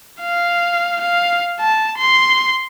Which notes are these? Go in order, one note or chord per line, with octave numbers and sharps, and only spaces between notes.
F5
F5
A5
C6